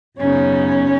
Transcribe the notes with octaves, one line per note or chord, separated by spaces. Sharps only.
F#2 C#3 B3 C#4 D#4 C#5